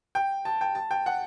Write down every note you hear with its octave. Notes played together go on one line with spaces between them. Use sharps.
G5
A5
G5
A5
G5
F#5